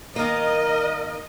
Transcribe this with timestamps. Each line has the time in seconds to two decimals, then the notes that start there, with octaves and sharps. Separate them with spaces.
0.16 D#3 A#3 A#4 D#5